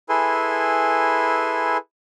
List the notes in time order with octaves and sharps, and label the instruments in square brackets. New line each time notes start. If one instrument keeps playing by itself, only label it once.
[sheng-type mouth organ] E4 G#4 A4 B4 G#5 C6